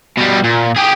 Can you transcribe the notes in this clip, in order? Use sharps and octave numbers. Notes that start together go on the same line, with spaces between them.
B2 G3
A#2
G4 G#4